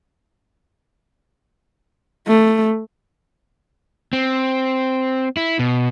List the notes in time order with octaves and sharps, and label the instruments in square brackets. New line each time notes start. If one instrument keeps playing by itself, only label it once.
[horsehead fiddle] A3
[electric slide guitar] C4
E4
B2